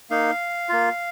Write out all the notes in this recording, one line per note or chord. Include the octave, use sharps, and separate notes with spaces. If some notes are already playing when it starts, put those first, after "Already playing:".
A#3 D#4 F5
A#3 F4